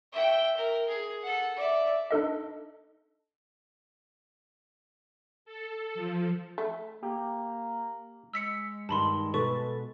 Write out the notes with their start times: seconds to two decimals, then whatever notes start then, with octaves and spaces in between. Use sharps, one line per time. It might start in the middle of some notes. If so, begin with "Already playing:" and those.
0.12 E5 G5
0.57 A#4
0.88 G#4
1.23 A4 F#5
1.56 D5 E5
2.11 D4 D#4 A4 D#5
5.45 A4
5.94 F3
6.58 A3
7.03 A#3 G4
8.33 G#3 E6 B6 C#7
8.89 G2 D#3 A5 B5 C6
9.34 B2 A4 B4 C#6